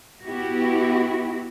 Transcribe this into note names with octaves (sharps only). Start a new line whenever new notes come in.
B3 E4 F#4 G4